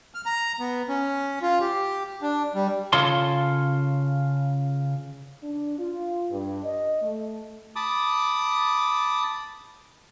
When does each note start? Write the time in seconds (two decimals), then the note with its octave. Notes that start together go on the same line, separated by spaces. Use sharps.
0.14 F6
0.26 A#5
0.59 B3
0.89 C#4
1.42 F4
1.60 G4
2.22 D4
2.55 G3
2.93 C#3 F4 A4 C#5 C6
5.42 D4
5.78 F4
6.29 G2
6.64 D#5
7.01 A3
7.76 A5 B5 D6 D#6